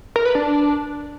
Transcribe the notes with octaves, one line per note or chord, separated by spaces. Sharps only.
A#4
B4
D4